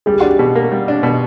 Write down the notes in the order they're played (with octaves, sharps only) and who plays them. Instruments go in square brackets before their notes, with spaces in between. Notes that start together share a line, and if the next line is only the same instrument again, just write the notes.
[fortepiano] G3 [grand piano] G#4
[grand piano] G4
[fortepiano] D4 [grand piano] F#4
[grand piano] G4
[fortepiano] B2
A#3
G3
D4
B2